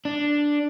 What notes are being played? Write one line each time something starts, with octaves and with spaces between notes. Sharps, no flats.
D4